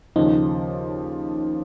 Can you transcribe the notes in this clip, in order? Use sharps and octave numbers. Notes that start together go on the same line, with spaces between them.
D#2 C#3 F3 D#4